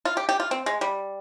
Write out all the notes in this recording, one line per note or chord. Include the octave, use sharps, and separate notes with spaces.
F4
G4
G4
F4
C4
G#3
G3